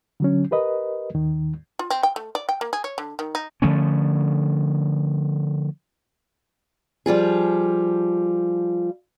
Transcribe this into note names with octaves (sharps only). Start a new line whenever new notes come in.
D3 F#3 C#4
G4 A#4 B4 D#5
D#2 D#3
F4
C4
G5
A3
D5
G5
A#3
G#4
C#5
D3
D#3
D#4
D3 F3 A3 C#4
F3 G3 F4 G#4